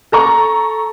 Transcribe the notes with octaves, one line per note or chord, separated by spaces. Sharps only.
A4 A#5 C#6